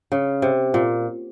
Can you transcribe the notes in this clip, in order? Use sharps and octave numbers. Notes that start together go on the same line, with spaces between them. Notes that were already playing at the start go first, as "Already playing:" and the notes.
C#3
C3
A#2